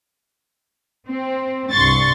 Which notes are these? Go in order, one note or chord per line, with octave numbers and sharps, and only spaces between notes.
C4
C2 G2 C6 C#6 A6